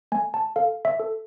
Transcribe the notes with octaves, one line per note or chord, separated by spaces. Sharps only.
A3 G#5
A5
A4 F5
E5
A4